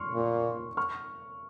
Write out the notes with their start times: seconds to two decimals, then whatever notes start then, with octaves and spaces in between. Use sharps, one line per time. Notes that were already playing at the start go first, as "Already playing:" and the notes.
Already playing: C6 C#6 F6
0.14 A#2
0.77 C#6 F6